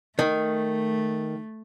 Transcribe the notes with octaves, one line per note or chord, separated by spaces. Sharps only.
D#3 A3